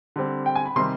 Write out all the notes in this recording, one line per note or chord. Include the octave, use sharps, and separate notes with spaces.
D3 G3 C4
G5
G#5
B5
C3 D#3 G3 C4 C6